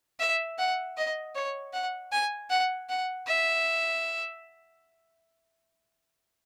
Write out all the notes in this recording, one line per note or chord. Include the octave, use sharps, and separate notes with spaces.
E5
F#5
D#5
C#5
F#5
G#5
F#5
F#5
E5